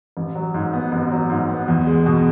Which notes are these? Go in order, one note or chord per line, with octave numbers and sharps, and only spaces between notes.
A1
F#3
G#2
B3
A1
F#3
G#2
B3
E2
G#3
B2